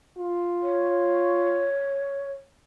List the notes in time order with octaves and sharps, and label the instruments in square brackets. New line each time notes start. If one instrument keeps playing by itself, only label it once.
[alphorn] F4
[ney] C#5